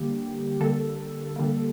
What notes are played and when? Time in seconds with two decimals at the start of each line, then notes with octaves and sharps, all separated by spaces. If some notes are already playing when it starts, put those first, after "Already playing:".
Already playing: D3 G3 A#3 G4
0.60 D3 G3 A#3 A4
1.36 D3 G3 A#3